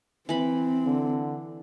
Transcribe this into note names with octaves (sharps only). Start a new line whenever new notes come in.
E3 C4 B5
D3